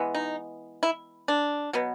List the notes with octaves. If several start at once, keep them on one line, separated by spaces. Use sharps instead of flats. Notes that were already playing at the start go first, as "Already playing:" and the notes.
Already playing: E3 G#3 B3
D#4
E4
D4
B2 F#3 B3